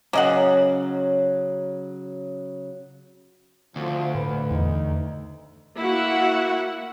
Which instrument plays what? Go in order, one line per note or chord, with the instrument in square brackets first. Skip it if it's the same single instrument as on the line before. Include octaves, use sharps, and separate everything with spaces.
[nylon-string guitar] C#3 F#3 C#4 [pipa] A#3 D#5 F#5
[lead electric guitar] D2 [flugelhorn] F3
[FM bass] A2 [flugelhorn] B4
[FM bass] E2 [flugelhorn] D#4
[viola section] A#3 E4 F#4 E5 F#5